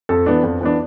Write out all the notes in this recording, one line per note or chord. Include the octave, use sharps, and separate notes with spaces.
F2 A4
E3 B3 D4
F2
E3 B3 D4